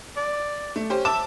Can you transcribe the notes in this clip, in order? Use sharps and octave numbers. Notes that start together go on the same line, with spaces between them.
D5
A3
C#4 G4 C5
E5 A5 D6 E7